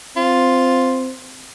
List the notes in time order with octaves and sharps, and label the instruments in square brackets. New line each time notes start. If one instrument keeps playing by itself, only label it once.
[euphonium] C4 [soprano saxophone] F4